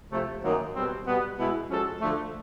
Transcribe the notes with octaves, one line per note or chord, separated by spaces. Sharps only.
C3 F3 A3
F#2 D#3 F#3 A#3 D#4
B2 G3 C4
B2 G3 B3
B2 G#3 B3 E4
F3 G#3 C#4 F#4 A4
D3 F3 A3